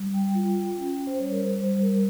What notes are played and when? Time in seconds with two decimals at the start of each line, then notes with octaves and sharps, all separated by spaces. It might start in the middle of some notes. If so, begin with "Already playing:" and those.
Already playing: G3
0.14 G5
0.35 F4
0.77 C#4
1.07 C5
1.19 G3 C#5
1.32 A#4
1.41 C5
1.61 G3 C5
1.82 A#4